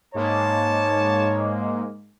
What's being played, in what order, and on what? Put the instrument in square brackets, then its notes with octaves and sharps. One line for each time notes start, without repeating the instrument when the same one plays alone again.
[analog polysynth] G#2 G#3 A#3 [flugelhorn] C#5 [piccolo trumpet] A5